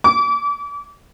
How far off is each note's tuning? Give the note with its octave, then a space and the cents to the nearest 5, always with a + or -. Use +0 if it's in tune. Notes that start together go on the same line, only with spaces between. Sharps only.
D6 -35